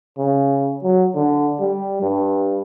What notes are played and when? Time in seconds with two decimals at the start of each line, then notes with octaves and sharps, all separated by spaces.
0.18 C#3
0.83 F#3
1.15 D3
1.60 G3
2.02 G2